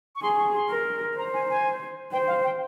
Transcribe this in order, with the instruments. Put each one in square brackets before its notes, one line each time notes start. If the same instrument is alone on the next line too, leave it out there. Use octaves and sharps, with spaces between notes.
[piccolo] C#6
[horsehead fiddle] G#4 [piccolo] C6
[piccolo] C#6
C6
[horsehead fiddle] A#4
[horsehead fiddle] C5 [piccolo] A#5
[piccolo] G#5
G#5
[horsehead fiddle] C5 [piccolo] G5
[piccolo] F5
G5